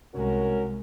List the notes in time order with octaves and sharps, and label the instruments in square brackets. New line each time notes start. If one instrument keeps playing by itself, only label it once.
[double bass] C2 G#3 [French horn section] C#4 F#4 A#4